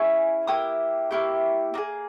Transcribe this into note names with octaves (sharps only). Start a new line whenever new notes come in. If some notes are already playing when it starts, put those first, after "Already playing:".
Already playing: C#4 E4 G#4 C#6
A#3 E4 G4 D#6
A#3 E4 G4 C#6
A#3 D#4 G#4